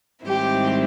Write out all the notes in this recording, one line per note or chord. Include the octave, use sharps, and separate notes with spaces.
G#2 D#3 G3 C4 E4 G4